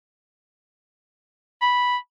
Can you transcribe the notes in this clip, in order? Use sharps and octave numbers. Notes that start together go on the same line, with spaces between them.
B5